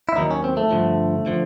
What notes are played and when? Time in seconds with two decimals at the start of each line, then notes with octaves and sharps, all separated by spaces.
0.09 E4
0.16 D#2 D#3 F#3 D#4
0.30 C#4
0.44 C4
0.57 A3
0.71 G2 D3 F3
1.26 D3 F3